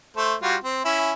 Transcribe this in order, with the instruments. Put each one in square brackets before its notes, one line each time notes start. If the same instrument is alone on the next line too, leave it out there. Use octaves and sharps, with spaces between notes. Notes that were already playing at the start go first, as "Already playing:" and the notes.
[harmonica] A3 A4 C5
G3 F4 F#4
C4
C#4 E4